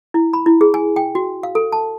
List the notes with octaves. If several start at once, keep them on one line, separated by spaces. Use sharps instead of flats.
E4
B5
E4
G#4
G#5
G5
F#4
F5
A4
A5